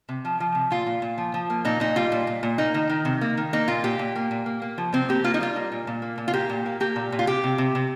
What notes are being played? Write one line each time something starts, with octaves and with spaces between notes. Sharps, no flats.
C3
F3
F3
C3
A#2 F4
A#2
A#2
F3
F3
A#3
A#2 D#4
A#2 D#4
G3 F4
A#2
A#2
A#2
A#3 D#4
D#3
D#3
C3
A#3
D#3
A#3 D#4
A#2 F4
A#2 G4
A#2
A#3
A#2
A#3
A#3
F3
C3 C4
A#3 G4
A#3 F4
D#4
G3 F4
A#3
A#2
A#2
A#3
A#2
F4
A#3 G4
A#2
A#3
A#3 G4
A#2
A#2
F4
C3 G4
C3
C3
C3